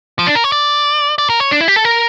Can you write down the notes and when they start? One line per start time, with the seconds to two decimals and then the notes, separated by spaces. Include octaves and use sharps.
0.19 F3
0.27 D4
0.35 A#4
0.44 C#5
0.52 D5
1.18 D5
1.30 A#4
1.40 C#5
1.51 D4
1.61 E4
1.68 G4
1.76 A4
1.85 A#4